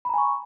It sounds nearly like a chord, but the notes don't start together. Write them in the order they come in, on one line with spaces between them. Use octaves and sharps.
B5 A#5 G#5 C#6